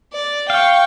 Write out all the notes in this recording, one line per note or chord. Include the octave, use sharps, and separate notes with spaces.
D5
F5 G5 C#6